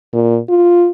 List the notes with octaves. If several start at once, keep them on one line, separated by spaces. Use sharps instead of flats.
A#2
F4